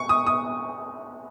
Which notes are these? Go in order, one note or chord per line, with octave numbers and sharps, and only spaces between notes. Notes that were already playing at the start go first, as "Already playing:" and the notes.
Already playing: C#6
D#6
D#6